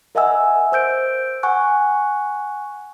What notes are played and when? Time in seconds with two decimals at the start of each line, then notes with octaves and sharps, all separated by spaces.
0.15 A#4 D#5 E5 F#5 G#5 E6
0.72 C5 E6 G6 D7
1.43 F#5 G#5 C#6 F#6